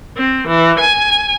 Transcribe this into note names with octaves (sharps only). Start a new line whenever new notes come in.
C4
E3
G#5